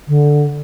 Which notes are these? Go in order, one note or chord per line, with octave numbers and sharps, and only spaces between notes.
D3